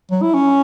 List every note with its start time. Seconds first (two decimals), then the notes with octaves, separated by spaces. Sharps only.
0.11 F#3
0.22 E4
0.34 C#4